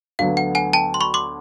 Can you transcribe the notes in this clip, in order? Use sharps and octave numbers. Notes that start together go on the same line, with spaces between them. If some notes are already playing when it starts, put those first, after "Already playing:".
D2 D3 F#3 B3 F5
F#5
F#5 G#5
G5 A5
C6
B5 C#6
C6 D6